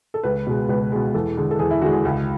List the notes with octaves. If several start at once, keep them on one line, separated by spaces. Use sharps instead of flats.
A4
C#2 B4
B2 G#3
C#2 B4
B2 G#3
E2 A4
D3 G#3
A4
E2 G#4
E4
D3 G#3 F#4
G#4
C#2